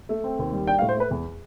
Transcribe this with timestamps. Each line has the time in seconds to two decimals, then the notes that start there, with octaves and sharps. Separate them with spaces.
0.09 A3
0.24 C4
0.39 D#2
0.52 G3
0.67 D4 G5
0.79 F5
0.82 A2
0.89 C5
0.96 A3 B4
1.11 E2